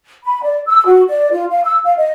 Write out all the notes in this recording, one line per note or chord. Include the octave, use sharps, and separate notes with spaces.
B5
D5
E6
F#4
D5
F4
F5
E6
F5
D#5